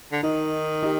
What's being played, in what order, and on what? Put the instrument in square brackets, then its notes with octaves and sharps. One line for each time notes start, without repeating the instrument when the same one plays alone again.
[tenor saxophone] D3
[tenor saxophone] D#3 [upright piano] D#4
[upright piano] D#4 G4